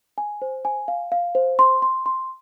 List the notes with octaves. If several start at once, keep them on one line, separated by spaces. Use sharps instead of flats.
G#5
C5
G#5
F5
F5
C5
C6
C6
C6